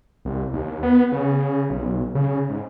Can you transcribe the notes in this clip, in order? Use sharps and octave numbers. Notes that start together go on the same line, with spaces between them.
C2
D#2
B3
C#3
B1
C#3
G#2